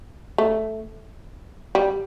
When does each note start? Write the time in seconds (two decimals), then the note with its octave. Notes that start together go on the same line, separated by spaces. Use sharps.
0.38 A3
1.75 G3